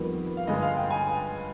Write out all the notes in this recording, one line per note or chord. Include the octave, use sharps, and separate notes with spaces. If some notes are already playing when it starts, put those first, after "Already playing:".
Already playing: F2 D#3 G3 B3
F5
G2 D3 G#3 D#5
F5
G5
G#5